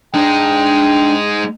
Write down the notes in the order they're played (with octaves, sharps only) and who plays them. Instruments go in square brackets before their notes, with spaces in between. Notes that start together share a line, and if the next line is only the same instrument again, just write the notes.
[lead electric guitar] G#3 D#4 [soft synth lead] D4 [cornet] G5